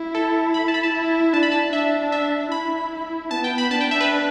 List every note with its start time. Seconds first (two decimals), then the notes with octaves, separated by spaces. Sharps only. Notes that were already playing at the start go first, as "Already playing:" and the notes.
Already playing: E4
0.15 A4
0.54 B5
0.68 A5
0.74 B5
0.83 A5
0.93 E4
1.33 D4 A5
1.43 B5
1.52 A5
1.73 D4 E5
2.12 E5
2.51 E4 B5
3.31 B3 A5
3.44 G5
3.58 B5
3.71 D4 A5
3.81 G5
3.91 E5
4.01 B4